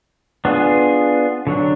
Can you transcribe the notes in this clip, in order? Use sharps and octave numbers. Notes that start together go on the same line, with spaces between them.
B3 D4 F4 G#4
D3 F#3 D4